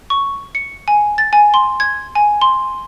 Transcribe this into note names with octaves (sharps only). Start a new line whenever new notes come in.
C#6
C#7
G#5
A6
G#5
C6
G#6
G#5
C6